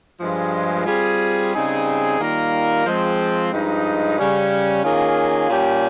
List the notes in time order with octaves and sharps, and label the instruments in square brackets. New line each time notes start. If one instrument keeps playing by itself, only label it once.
[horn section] G2 F3 G#3
G3 C4 F4 G#4
C#3 G3 C4 D#4 G#4
D#3 G3 A#3 F4 A#4
F3 G#3 C4
G2 F3 G#3 D#4
C#3 G3 C#4
D#3 A#3 C#4 F4 G#4
A#2 G3 C#4 G4